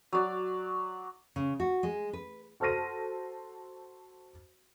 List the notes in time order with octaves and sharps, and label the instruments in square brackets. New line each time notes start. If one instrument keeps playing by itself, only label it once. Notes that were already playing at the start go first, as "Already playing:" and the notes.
[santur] F#3 D5
[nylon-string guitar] C#3
F#4
G#3
B4
[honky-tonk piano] F#4 A4 C5 F6 A#6 D#7